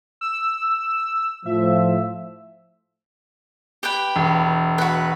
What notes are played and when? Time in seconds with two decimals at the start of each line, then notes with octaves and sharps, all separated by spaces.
0.21 E6
1.46 A2 F3 E5
3.83 G4 B4 G5
4.16 E1
4.78 F#4 B4